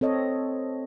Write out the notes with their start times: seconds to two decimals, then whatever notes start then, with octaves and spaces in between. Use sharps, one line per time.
0.01 C4 A4 C#5 D#5